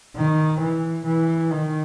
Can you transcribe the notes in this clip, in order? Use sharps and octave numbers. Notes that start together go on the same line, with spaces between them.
D#3
E3
E3
D#3